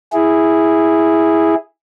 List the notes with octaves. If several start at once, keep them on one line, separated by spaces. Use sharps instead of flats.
E4 G#4